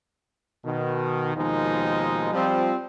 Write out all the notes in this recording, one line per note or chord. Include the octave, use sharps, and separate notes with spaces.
B2 D#3
D#2 B2 D#3 F3 G#3 D#4
F3 G3 C4